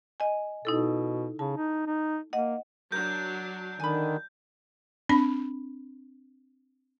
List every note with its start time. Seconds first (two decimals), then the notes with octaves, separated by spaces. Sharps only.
0.20 D#5 G#5
0.65 B2 D#4 E4 A4
1.39 C#3 A5
1.57 D#4
1.87 D#4
2.33 A#3 D#5 F#5
2.92 F#3 D4 A#4 G6
3.80 D3 D#3 G#5 B5
5.09 C4 D4 B5